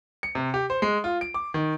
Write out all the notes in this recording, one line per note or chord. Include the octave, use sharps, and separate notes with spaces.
C#7
C3
G4
C5
G#3
F4
D7
D6
D#3